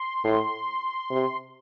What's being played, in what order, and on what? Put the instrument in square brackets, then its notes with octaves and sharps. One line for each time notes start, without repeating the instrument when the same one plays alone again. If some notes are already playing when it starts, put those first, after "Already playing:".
Already playing: [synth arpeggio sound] C6
[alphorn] A2
C3